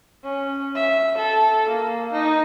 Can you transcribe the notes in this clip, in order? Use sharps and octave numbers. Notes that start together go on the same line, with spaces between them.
C#4
E5
A4
A#3
D#4